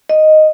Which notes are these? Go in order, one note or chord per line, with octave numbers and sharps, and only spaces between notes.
D#5